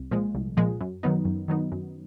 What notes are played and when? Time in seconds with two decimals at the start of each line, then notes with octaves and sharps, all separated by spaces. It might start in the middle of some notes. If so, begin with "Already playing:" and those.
Already playing: C2
0.11 A#2 F3 G#3
0.35 C2
0.57 A#2 F3 G#3
0.80 F#2
1.03 D#3 F#3 B3 D#4
1.25 F#2
1.48 D#3 F#3 B3 D#4
1.72 F#2